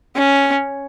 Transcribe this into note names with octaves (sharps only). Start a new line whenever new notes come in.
C#4